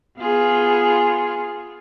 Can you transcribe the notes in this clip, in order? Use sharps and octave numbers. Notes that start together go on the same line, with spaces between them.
B3 F4 G#4